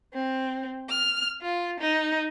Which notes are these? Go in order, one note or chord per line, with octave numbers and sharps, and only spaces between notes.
C4
F6
F4
D#4